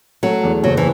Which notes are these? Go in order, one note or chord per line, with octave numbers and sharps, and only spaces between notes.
F#3 A3
E2
F#1 F#3
E3